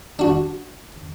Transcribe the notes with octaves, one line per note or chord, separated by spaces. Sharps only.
D4 F#4